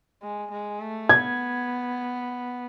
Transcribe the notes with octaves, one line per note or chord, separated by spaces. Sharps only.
G#3
G#3
A3
B3 G#6